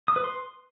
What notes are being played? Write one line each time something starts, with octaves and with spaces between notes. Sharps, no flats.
D#6
B4
C6